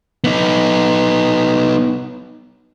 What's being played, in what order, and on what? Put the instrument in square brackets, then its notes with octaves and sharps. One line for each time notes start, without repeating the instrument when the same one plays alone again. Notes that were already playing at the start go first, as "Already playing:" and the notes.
[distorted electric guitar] B3 D#4